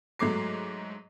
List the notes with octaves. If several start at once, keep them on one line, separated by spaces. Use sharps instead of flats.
G#2 F#3 A3 D6 C7